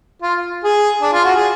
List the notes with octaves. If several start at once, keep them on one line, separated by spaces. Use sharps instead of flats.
F4
G#4
D4
F4
F#4
G#4